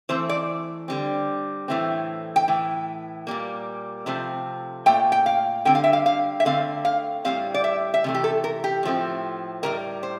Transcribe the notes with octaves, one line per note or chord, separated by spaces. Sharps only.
E3 A3 C4 C5
D5
D3 G3 C4
A2 E3 A3 C4
G5
A2 E3
A#2 G3 A#3
C3 F3 A3 C4
A#2 A3 G5
G5
F5
D3 G3 C4 G5
F5
E5
F5
F5
E5
D3 A3 C4 F5
F5
A2 G3 C4 F5
D5
E5
E5
C3 E3 A3
G4
A4
A#4
G4
A2 F3 A3 C4
A2 E3 G3 A#4
C5